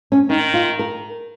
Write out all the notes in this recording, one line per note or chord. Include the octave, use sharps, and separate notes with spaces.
C#4
D#3 D#4
F4
A#4